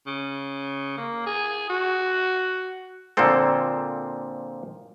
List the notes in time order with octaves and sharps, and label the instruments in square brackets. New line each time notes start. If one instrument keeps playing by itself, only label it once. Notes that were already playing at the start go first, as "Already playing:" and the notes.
[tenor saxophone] C#3
A#3
G#4
F#4
[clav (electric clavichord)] A#2 D3 F3 A#3 C4 A4